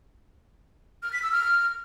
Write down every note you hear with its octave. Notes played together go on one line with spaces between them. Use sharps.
F6
B6
E6
F6